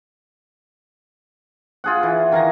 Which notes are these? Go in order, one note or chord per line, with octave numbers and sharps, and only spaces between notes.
F4 G#4 F#5
E3
D#3 F5 G#5 A#5